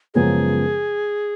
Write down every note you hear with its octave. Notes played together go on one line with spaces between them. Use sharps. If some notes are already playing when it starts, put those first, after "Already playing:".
F#2 C#3 F3 G#3 B3 G#4